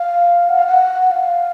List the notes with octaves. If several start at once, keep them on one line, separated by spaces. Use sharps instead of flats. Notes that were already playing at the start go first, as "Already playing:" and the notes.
Already playing: F5
F#5
F5
F#5
F#5
F5